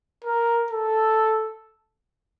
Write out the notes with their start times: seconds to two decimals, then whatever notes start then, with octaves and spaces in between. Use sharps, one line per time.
0.24 A#4
0.71 A4